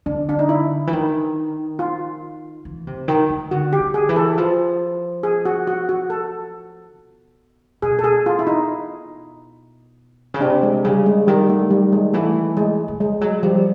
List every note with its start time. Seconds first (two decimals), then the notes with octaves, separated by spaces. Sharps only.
0.06 D3 D4
0.29 D4
0.39 D#4
0.49 E4
0.87 E3
0.93 D#3
1.79 F4
2.65 E3
2.87 C3
3.08 D#3
3.29 D#3
3.51 D3 F#4
3.73 G4
3.80 D3
3.94 G#4
4.09 E3
4.16 A4
4.38 F3
5.23 G#4
5.45 F#4
5.67 F#4
5.89 F#4
6.10 A4
6.96 B2
7.82 B2 G#4
7.99 A4
8.04 G#4
8.26 F4
8.39 E4
8.47 D#4
10.34 C#3
10.41 C3 D4
10.63 G#3
10.84 C#3 G3
11.06 G#3
11.27 D#3 G3
11.49 A3
11.70 G3
11.92 G#3
12.14 E3 A3
12.57 G#3
12.88 E3
13.00 F3 G#3
13.21 F#3 G#3
13.43 F3 G3